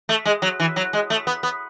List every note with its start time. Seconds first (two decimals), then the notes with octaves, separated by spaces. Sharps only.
0.09 A3
0.25 G#3
0.42 F#3
0.60 E3
0.76 F#3
0.93 G#3
1.10 A3
1.27 B3
1.43 B3